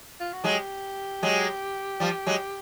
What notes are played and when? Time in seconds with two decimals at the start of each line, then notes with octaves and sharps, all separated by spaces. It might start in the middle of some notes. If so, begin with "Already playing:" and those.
0.20 F4
0.33 F#4
0.44 F#3 G#3 G4
1.23 F#3 G#3
2.00 F3 G3
2.26 F#3 G#3